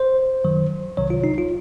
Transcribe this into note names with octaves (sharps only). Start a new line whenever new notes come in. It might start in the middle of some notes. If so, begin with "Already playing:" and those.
Already playing: C5
F#2 D#3 F#3
C2 C3 D#3 F#3 C#5
F4
D#4
F4